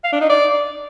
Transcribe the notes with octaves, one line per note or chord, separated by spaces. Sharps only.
F5
D4
D#4
D5